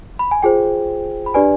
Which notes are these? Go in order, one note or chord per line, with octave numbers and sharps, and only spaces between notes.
B5
G#5
F4 G#4 C5 G5
B5
D4 G4 B4 D5 G#5